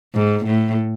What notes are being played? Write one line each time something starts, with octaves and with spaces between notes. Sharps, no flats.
G#2
A2